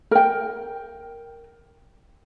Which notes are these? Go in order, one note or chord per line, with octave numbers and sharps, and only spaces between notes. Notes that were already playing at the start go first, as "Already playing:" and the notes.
A#4 G5